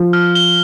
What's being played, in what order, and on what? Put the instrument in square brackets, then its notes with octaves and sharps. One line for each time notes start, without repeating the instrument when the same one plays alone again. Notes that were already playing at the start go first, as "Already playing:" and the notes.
Already playing: [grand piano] F3
[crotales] F6
G7